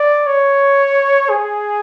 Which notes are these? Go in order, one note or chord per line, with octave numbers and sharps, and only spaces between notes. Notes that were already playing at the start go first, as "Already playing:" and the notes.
Already playing: D5
C#5
G#4